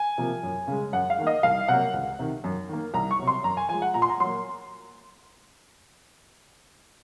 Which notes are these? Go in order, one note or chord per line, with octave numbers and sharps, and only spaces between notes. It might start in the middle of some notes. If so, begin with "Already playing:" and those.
Already playing: G#5
C3 F3 A#3
F#2
C#3 G#3
F#2 F#5
F5
D#3 A#3
D#5
C2 F5
C3 F#3 A#3 F#5
C#2
C3 D#3
F#2
D#3 A#3
C2 A#5
C#6
C3 F#3
C6
F#2 A#5
G#5
F3 G#3 G#5
F#5
A#2 A#5
C6
A#5
F#3 A#3 C6